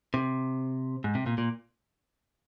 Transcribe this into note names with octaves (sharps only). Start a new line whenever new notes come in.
C3
G#2
C3
A#2
A#2